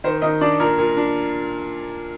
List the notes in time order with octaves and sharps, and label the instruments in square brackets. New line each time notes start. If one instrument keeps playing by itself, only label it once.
[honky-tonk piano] D#3 C5
D#3 D#5
D4 D5
A#2 A#4
A#2
D4